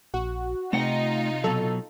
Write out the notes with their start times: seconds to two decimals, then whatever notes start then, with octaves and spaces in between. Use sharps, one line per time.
0.14 A#1 F#4
0.73 C3 A3 D#4 F4 F#5 G5 A#6
1.44 B2 F#3 A4